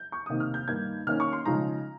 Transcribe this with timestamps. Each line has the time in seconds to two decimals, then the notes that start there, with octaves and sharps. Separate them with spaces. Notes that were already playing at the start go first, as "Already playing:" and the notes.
Already playing: G6
0.12 C#6
0.26 C3 D#3 A#3 D#6
0.40 F6
0.54 G6
0.68 G2 D#3 A#3 D#4 G#6
1.07 D#3 A#3 C#4 F6
1.20 C#6
1.33 C6
1.45 C#3 F3 G#3 D#4 A#5